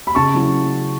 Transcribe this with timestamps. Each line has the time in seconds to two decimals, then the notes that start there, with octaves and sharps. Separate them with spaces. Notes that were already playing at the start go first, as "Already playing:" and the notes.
0.07 B5
0.15 C#3 A5 C#6
0.35 F#3 C#4 E4